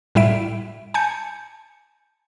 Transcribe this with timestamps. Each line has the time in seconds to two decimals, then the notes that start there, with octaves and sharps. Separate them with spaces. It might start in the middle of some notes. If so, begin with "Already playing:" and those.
0.15 A2 G3 E4 E5 D7
0.94 G#5 A5 G6 C#7